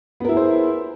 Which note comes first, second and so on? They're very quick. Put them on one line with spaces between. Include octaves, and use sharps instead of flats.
B3 A#4 E4 G#4 C5